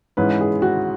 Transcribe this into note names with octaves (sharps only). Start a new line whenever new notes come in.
G#2 E3 G#3 C#4 B4
G#4
F#4